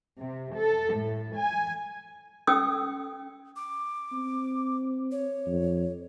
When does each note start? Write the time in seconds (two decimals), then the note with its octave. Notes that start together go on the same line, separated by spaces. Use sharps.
0.19 C3
0.54 A4
0.95 A2
1.35 G#5
2.47 C#4 A4 G5 D#6 E6
3.56 D6
4.12 C4
5.12 C#5
5.47 F2